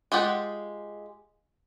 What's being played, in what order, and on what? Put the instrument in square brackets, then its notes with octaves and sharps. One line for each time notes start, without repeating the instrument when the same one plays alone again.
[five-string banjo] G#3 F4 G4 F#5 G5